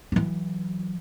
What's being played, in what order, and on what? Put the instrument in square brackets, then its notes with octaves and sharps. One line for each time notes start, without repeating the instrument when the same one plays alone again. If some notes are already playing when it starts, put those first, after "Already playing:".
[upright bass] E3 F#3